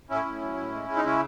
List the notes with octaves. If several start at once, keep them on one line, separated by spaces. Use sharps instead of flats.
A2 C#4 E4
A2
F#3
A2
G#3
G#3
D#4
C#3 C#4 E4